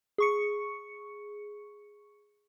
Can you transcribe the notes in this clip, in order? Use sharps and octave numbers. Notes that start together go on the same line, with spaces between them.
G#4 C#6 C#7